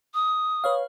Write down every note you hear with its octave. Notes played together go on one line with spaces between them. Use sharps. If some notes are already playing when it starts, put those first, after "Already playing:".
D#6
B4 C#5 F5